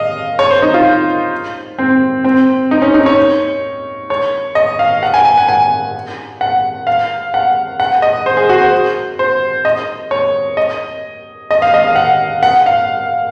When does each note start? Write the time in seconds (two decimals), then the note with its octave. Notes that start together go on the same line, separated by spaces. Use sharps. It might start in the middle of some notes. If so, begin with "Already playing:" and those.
Already playing: D#5 F5
0.39 C#5
0.51 C5
0.62 D#4
0.74 F4
1.78 C4
2.24 C4
2.71 D#4
2.82 C#4
2.94 D#4
3.06 C#5
4.10 C#5
4.55 D#5
4.79 F5
5.03 F#5
5.14 G#5
5.25 G#5
5.38 F#5
5.49 G#5
6.41 F#5
6.87 F5
7.34 F#5
7.80 F#5
8.02 D#5
8.26 C5
8.37 G#4
8.49 F#4
8.61 C5
9.19 C5
9.65 D#5
10.11 C#5
10.57 D#5
11.51 D#5
11.62 F5
11.74 D#5
11.87 F5
11.96 F#5
12.43 F#5
12.66 F5